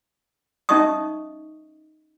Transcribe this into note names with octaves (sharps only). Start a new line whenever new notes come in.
C#4 D#4 D#5 E5 C#6 D#6